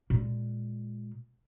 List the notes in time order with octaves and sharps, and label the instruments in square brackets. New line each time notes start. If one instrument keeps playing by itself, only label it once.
[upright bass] A#2 G#3